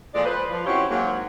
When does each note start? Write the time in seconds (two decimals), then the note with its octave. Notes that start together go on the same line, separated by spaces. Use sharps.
0.14 A#2 F3 G#3 A4 D5
0.25 B4 C5
0.50 F3
0.66 C4 C#4 E4 F#4 G4 C#5
0.91 G#2 F#3 A#3